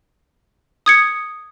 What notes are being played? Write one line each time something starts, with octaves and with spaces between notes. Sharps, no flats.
D#6 G#6 C#7